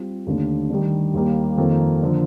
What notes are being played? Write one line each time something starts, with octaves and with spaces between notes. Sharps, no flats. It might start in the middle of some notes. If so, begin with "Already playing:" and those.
Already playing: G3 C4 F4
D#2 D3 A3 D4
D#3 G3 D4
D#2 D#3 G3 A#3
F2 D#3 A#3 F4 A4
D3 F3 A#3